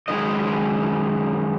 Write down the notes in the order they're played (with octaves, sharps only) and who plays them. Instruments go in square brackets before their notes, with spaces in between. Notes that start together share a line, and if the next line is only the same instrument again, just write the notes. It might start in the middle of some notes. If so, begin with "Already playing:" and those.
[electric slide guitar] F#2 D#3 G#3 C#4 D#5